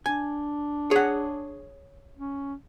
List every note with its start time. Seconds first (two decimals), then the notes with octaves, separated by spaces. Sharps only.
0.06 D4 G#5
0.91 G#4 C#5 F#5
2.17 C#4